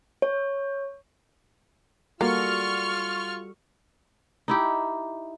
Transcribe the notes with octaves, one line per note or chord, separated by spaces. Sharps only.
C#5
G3 A#3 F4 F#4 A4 C#6 F6
D#4 E4 G4